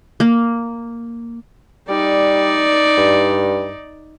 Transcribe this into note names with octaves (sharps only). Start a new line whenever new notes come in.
A#3
G3 D#4 D5
G2